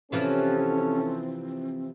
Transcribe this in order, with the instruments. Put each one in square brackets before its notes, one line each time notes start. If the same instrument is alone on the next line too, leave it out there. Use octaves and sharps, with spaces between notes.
[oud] C3 E3 F3 [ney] C4 [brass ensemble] C#4 [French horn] A4